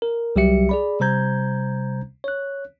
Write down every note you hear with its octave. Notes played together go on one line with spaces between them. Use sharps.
A#4
C2 F#3 G3 G4 E5 C#7
G#4 D5 B5
C3 G3 C5 A#5 G6 G#6
C#5 F#6